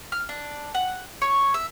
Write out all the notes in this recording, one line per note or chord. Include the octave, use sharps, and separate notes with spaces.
F6
D4
F#5
C#5
E5